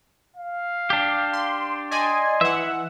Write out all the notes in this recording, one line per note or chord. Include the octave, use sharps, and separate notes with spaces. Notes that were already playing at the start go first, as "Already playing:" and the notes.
F5
D4 G4
C6
D5 D#5 G#5 C6
E3 E5 F#5